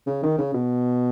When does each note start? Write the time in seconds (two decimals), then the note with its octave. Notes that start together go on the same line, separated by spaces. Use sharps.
0.07 C#3
0.23 D#3
0.38 C#3
0.54 B2